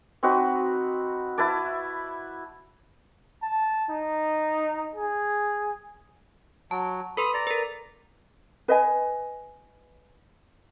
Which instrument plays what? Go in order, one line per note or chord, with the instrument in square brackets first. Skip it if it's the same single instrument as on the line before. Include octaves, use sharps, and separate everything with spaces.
[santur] C4 D#4 F#4 B4
E4 B4 A5 D6
[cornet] A5
D#4
G#4
[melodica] F#3 [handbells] A5
[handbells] A4 B4 C6 [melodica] B5 D#6
[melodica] D5 A#5
[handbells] A#4 B4
[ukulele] B4 D#5 G#5